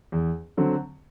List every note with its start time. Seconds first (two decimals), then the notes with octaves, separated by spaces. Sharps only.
0.12 E2
0.57 D3 F#3 C4